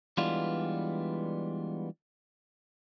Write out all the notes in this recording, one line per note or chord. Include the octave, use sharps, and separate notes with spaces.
E3 G3 G#3 B3 D4 F4